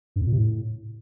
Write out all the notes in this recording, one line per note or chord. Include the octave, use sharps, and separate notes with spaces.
G2
F2
A#2
C3
A2